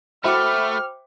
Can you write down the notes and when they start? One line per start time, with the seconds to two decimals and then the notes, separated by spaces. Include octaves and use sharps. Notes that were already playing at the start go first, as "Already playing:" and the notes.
0.24 A3 F#4 C5 E5 G5 B5 D6 F6